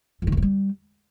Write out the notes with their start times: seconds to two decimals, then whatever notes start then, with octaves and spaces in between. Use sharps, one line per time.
0.22 F2
0.27 D#3
0.32 F#2
0.37 G2
0.42 G3